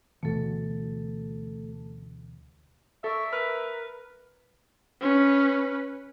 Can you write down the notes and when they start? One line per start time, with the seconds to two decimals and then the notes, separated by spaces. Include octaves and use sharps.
0.23 D2 B2 E3 A3 A4
3.04 A#3 A4 D5 E5 C#6
3.33 A#4 B4 F6
5.01 C#4 B4